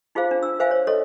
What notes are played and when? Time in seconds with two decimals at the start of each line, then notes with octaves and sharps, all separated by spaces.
0.15 D#4 F4 G#4 C5 F5
0.31 D4
0.43 E6
0.59 B4 C5 E5 F5 G#5
0.71 C#5
0.87 A4 C#5 D#5